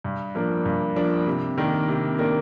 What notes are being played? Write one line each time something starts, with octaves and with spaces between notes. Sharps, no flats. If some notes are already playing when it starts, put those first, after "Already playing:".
G2
F3 A#3 D4
G2
F3 A#3 D4
C3
D#3 A#3 D4
C3
D#3 A#3 D4